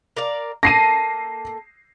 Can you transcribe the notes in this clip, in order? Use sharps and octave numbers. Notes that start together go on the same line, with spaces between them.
A#4 D5 F5
A#3 A4 A#6 C7 D#7